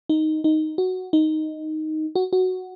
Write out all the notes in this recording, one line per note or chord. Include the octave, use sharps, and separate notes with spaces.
D#4
D#4
F#4
D#4
F#4
F#4